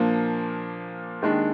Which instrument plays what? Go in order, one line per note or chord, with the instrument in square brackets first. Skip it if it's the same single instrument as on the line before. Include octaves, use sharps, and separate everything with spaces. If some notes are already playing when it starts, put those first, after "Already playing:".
Already playing: [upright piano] A#2 F3 A#3 D4
D#2 D#3 G#3 D4